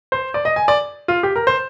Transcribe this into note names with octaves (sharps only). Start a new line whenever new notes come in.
C5
D5
D#5
G#5
D5
F4
G4
A#4
C5